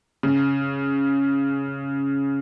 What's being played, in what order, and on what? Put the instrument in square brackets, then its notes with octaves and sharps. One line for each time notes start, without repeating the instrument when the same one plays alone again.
[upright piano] C#3